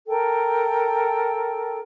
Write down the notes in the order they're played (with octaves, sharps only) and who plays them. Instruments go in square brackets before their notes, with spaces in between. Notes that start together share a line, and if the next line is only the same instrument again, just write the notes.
[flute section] A4 A#4 G5